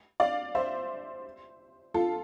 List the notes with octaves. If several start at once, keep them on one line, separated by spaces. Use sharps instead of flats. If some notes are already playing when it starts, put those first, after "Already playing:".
D5 F5
C5 E5
F4 A4